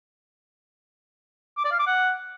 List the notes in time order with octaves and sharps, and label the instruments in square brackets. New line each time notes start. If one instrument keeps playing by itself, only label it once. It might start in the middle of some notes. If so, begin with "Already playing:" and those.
[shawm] D6
D5
F5
D6
F#5